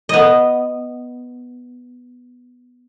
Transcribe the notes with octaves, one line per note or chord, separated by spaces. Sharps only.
B3 D#5